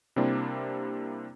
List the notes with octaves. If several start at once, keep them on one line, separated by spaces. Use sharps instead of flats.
C3 G3 A#3 C4 D4 E4